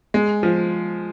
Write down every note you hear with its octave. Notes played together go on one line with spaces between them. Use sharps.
G#3
F3